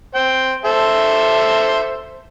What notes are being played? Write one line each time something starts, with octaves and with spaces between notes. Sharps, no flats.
C5 G5
A4 C5 E5